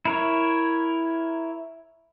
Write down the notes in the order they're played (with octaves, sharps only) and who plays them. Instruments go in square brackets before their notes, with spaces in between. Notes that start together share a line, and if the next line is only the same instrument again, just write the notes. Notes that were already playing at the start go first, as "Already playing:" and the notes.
[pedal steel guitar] E4 A#4 C#5